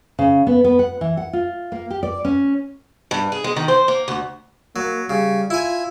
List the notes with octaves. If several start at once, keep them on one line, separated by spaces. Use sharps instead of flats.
C#3
B3
B3
F#5
E3
F#5
F4
A#3
G4
D5
C#4
G2
G#4
G#3
D#3
C5
A#3
D2
F#3 A#3
C#3 G3
E4 F4 G#5